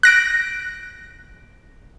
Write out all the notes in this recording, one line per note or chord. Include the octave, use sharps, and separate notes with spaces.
F#6 A#6 D7